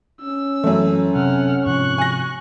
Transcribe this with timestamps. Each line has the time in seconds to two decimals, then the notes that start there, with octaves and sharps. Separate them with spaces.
0.22 C#4 E6
0.64 F#2 E3 A3
1.16 C3 F#5 F6
1.66 G#2 C3 F3 C#6 F#6
1.98 G#5 A#6